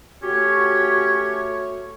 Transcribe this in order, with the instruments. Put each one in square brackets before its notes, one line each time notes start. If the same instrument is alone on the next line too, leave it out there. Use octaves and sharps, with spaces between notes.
[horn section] A3 C#5 [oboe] C#4 [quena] F#4 [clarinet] G4